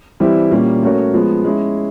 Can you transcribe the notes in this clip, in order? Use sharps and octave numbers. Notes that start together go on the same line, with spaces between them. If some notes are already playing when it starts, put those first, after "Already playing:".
E3 G3 C4 E4 G4
A#2 G3 A#3 C#4
A3 C#4 F#4 A#4 C#5
F3 G#3 B3
G#3 C#4 E4